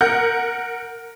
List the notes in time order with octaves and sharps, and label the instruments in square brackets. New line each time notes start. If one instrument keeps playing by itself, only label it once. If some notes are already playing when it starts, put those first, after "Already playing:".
[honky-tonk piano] A#4 F#5 G6